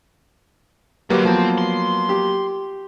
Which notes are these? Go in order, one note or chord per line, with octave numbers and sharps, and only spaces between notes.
G2 D3 F#3 A#3 G4 B4
F3 B3 C5 G5
C6
G4